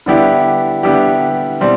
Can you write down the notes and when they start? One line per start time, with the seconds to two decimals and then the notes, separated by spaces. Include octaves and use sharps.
0.06 D3 G3 B3 E4 G4
0.83 D3 G3 B3 E4 G4
1.61 B2 G3 C4